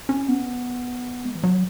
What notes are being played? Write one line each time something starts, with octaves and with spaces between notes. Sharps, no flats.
C#4
B3
G#3
E3
F#3